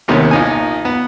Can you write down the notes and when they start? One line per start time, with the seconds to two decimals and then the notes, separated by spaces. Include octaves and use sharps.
0.08 D#2 C3 D#3 B3 C#4
0.31 A#1 D#4 G#5
0.85 B3